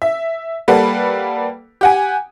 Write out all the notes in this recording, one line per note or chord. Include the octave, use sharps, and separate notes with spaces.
E5
G3 A#3 A4 B4 F#5
G4 F#5 G#5